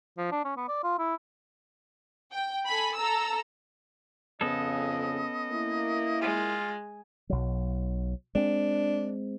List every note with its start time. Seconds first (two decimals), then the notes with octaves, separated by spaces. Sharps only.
0.18 F3
0.31 D4
0.45 C#4
0.57 B3
0.68 D5
0.83 F4
0.99 E4
2.32 G5
2.66 A4 G#5 B5
2.97 A4 A#5 E6
4.41 F2 C#3 B3 C#4 A4 D#5
5.51 A#3 E4
6.21 G#3 F4
7.30 B1 F#3
8.35 G#3 C4 D4